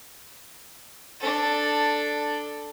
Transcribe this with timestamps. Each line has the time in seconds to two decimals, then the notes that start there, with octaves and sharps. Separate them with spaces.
1.20 D4 A4